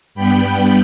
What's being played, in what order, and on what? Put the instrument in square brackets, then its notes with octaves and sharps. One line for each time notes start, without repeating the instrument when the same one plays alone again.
[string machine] G2 G3 B3 G5 B5